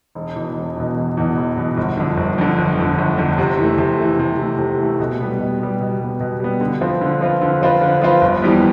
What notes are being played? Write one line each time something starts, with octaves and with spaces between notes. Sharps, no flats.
E1
E2 B2
E1
E2 B2
E1
E2 B2
E1
E2 B2
G1
F2 D3
G1
F2 D3
G1
F2 D3
G1
F2 D3
C3
E3 A3
C3
E3 A3
C3
E3 A3
C3
E3 A3
B2
G3 B3
B2
G3 B3
B2
G3 B3
B2
G3 B3
D3
F3 C4 F4 B4
D3
F3 C4 F4 B4
D3
F3 C4 F4 B4
D3
F3 C4 F4 B4
G1
F2 E3 G3 B3